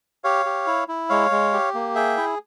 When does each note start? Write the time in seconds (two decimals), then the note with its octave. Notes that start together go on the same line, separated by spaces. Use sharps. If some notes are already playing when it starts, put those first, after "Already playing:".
0.24 G4 C#5 F5
0.46 G4
0.67 E4
0.88 E4
1.09 G#3 C#5 F5
1.31 G#3
1.53 G4
1.74 A#3
1.95 G#4 E5 G5
2.17 E4